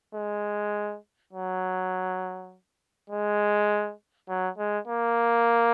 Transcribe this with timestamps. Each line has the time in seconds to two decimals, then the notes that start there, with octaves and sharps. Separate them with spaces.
0.14 G#3
1.33 F#3
3.10 G#3
4.28 F#3
4.58 G#3
4.87 A#3